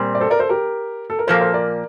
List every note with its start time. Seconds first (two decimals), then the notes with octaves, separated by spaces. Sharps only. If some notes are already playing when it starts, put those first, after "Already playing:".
Already playing: A#2 G3 C4
0.15 D5
0.20 A4 C5
0.30 A#4 D5
0.40 A4 C5
0.49 G4 A#4
1.10 A4
1.19 A#4
1.27 A#2 F3 A#3 A4 C5
1.40 A4 C5
1.54 A#4 D5